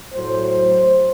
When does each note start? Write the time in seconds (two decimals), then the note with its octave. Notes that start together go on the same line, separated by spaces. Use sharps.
0.14 A2 F#3 A3 C5